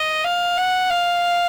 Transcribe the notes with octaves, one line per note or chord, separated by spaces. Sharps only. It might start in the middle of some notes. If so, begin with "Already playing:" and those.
Already playing: D#5
F5
F#5
F5